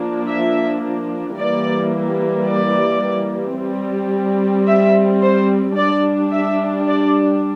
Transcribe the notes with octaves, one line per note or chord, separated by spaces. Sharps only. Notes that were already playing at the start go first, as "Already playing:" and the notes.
Already playing: F3 A#3 D4
E5
E3 G3 A#3 D5
D5
G3 C4
E5
C5
G3 D4 D5
E5
D5